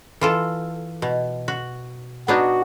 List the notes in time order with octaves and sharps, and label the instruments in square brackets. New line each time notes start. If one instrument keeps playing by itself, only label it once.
[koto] E3 F4 A4
B2
F#4
[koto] B3 D4 D#4 [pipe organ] F#4